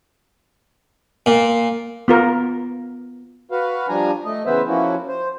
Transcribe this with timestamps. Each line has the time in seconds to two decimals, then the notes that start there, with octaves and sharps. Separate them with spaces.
1.26 A#2
2.08 B3 F4 A#4
3.51 F#4 B4 F5
3.89 F3 G3 D4 G#5 A#5
4.25 A3 D#5
4.46 C#3 E3 B3 B4 C5 E5
4.67 F3 A#3 C#4 E4 F#4
5.08 C5